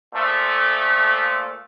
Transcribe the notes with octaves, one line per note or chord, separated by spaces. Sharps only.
A#2 F3 A3